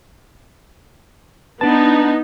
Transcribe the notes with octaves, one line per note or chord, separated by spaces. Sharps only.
B3 D4 D#4 A5